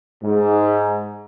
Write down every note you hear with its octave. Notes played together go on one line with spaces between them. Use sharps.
G#2